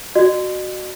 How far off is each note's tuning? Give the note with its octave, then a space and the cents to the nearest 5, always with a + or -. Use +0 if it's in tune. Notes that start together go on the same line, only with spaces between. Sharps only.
F#4 +0 D#5 -45